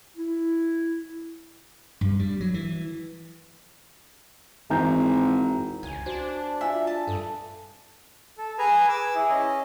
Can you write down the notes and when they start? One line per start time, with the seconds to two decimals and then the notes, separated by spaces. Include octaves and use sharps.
0.16 E4
2.01 G2
2.19 G3
2.40 F#3
2.54 E3
4.70 G#1 E3 A#5 G6
5.83 C#2 G#5
6.06 D4 F#4 C5
6.61 F4 E5 F5 G#5
6.87 A5
7.07 G2 A4
8.38 A4
8.59 G#4 B4 G#5 A#5
8.89 D6 E6
9.15 E4 G#4
9.30 C#4 D#5